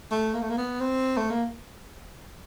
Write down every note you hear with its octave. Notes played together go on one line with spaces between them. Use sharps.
A3
A#3
A3
A#3
B3
C4
A3
A#3